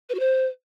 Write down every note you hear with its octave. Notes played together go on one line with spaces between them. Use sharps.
B4
F#4
C5